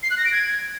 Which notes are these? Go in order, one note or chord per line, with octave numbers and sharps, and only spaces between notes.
C7
F#6
A#6
D7
G#6